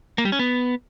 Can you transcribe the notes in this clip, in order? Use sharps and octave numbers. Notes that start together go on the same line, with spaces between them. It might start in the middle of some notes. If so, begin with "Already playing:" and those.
A#3
G3
C#4
B3